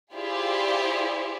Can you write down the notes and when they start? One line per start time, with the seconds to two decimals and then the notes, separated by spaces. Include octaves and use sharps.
0.14 E4 F4 G4 G#4 C5 D5